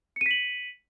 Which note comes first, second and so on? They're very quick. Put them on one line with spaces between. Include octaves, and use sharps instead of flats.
C#7 D#7 B6 F#7